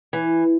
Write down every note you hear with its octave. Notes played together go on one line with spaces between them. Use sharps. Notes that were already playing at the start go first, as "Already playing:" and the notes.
E3